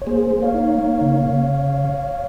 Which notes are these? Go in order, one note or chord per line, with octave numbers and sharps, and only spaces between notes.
C#5
A#3 G#4 C5
A#3
C#5 F5
D#4
A#3
C#3
C#3